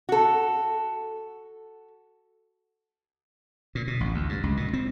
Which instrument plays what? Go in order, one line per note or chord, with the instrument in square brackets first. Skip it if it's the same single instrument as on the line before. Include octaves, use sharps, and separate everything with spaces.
[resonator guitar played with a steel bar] F#4 A4
[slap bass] A#2
B2
A1
D2
G2
C#2
A#2
C4